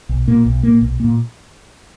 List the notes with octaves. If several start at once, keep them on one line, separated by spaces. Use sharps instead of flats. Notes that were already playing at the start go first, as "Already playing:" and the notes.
B1
A#2 A#3
B1
A#2 A#3
B1
A#2 A#3